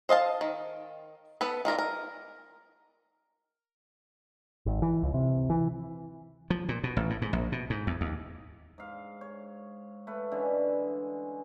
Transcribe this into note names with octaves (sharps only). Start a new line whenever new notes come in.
C5 D#5 F5 A5
D#3
B3 A4 B4
D#3 F4 A#4 D5
A#4
G#1
E3
C#2
C3
E3
F3
A#2
B2
A1
A2
G#2
A#1
B2
G#2
E2
D#2
G#2 F5
C#5
A3 B4
D3 E3 G#3 C#4